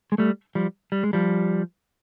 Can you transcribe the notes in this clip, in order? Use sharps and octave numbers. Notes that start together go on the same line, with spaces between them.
G#3
G3 A3
F3 G3
G3
G#3
F3 G3